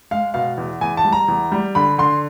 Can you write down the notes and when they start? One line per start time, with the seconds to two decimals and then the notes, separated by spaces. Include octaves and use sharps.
0.11 G#3 F5
0.34 B2 F5
0.57 E2
0.81 E2 G#5
0.97 A5
1.05 G3
1.12 A#5
1.28 E2
1.52 G3
1.75 D3 B5
1.98 D3 C6